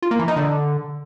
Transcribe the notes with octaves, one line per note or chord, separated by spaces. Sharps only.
F4
A#3
E3
D#4
D3